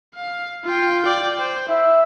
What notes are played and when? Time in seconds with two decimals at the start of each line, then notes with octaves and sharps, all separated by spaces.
0.15 F5
0.64 F4 G5
1.02 D5 G5
1.38 C5 G5
1.69 E4 E5